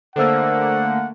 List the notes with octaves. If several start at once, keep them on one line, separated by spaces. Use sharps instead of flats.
D3 A3 A#3 A4 C5 F#5 E6